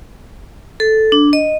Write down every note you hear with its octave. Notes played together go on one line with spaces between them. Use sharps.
A4
D4
D#5